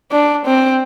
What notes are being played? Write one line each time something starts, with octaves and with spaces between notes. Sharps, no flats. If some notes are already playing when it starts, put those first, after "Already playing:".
D4
C4